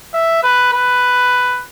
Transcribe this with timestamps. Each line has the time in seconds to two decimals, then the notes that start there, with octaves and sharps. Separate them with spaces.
0.14 E5
0.43 B4
0.73 B4